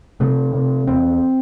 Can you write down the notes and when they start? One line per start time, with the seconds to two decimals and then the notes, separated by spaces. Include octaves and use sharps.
0.20 C3 A3
0.53 C3
0.87 E2 C4